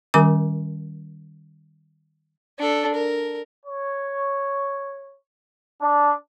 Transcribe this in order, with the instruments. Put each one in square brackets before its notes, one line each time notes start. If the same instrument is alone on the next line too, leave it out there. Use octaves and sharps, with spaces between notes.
[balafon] D#3 G3 C#4 A#4 G#5 D6
[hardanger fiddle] D4 A4
A#4
[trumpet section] C#5
D4